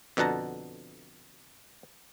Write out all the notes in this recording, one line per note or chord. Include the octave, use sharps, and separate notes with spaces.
F2 B2 D3 F#5 A5 A#5